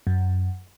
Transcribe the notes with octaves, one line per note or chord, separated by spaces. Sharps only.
F#2